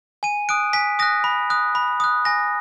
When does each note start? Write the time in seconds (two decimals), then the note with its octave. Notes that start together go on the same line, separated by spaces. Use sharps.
0.23 G#5 D#7
0.49 D#6 F#6 D7
0.73 G#5 B6
0.99 D#6 F#6 A#6
1.24 B5
1.50 D#6 F#6
1.75 B5
2.00 D#6 F#6
2.25 G#5 A#6